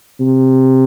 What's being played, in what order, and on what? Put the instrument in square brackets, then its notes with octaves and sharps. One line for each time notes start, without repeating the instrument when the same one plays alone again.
[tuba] C3